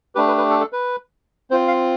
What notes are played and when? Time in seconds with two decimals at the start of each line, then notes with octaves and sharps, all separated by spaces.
0.15 A3 D4 G4 B4
0.28 B4
0.38 B4
0.50 A4
0.61 A4
0.73 B4
1.51 C4 F4 C5
1.68 F5